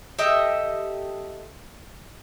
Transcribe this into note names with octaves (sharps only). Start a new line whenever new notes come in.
G4 A4 D#5 E5